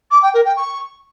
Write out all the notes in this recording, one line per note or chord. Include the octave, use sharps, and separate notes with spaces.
D6
G5
A#4
G5
C#6